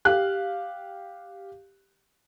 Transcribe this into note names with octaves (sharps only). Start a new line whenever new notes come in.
G4 F5 F#6